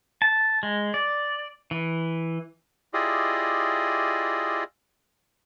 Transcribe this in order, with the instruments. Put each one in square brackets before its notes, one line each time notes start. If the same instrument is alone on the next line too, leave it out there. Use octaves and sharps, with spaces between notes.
[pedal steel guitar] A5
G#3
D5
E3
[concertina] E4 F4 G4 G#4 D5 D#5